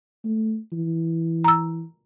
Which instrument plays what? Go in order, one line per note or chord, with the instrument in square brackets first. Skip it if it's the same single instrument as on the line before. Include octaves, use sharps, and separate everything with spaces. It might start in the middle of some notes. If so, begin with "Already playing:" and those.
[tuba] A3
E3
[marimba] A#5 E6